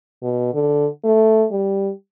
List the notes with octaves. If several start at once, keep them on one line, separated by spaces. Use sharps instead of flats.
B2
D3
A3
G3